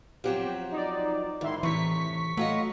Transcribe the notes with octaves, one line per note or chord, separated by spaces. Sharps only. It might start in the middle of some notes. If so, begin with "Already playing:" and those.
F3 F#3 C4 G4
D#4 D5
G#2 D#3 E4 C6
A2 C3 E3 C#6 B6
F#3 A3 F4 D#5